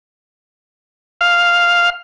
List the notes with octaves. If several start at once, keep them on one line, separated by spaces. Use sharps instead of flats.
F5